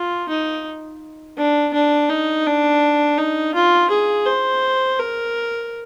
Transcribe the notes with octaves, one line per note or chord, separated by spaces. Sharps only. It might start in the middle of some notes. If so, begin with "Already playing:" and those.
Already playing: F4
D#4
D4
D4
D#4
D4
D#4
F4
G#4
C5
A#4